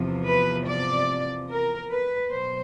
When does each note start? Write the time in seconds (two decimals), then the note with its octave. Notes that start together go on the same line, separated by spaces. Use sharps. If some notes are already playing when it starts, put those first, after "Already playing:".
Already playing: E2 C3 F3
0.27 B4
0.67 D5
1.49 A#4
1.90 B4
2.31 B2 F#3 C5